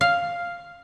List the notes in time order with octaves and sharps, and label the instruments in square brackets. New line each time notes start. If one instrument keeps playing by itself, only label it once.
[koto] F5